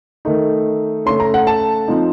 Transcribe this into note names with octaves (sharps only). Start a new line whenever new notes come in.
D#3 A3 D#4
C#3 A3 C#4 C6
A#5
F#5
A5
F3 C4 D#4